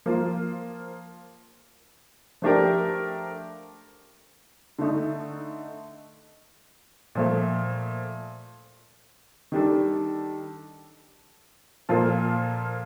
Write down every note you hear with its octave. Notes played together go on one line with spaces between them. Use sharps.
F3 A#3 F4
F3 A3 D4 G4 A#4
D3 A3 D#4
A#2 F3 A3
D#3 G3 D4 A4
A#2 F3 A#3 F4 A4